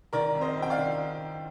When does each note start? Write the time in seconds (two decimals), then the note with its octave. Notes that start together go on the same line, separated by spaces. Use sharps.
0.13 D#3 A#4 D5
0.35 F2
0.41 C5 D#5
0.57 F2
0.62 G5
0.70 D5 F5
0.78 D#3